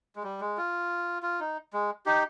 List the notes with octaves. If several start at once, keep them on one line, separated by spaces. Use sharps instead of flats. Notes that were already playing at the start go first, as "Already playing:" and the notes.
G#3
G3
G#3
F4
F4
D#4
G#3
D#4 G4